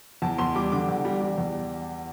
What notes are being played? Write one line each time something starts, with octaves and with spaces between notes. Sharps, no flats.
E2 A5
E2 C6
G3 D6
D3 D6
E2
G3
G3
E2